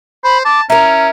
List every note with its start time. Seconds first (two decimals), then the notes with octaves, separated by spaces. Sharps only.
0.24 C5 B5
0.45 A5 D6
0.70 C#4 E4 A#4 A#5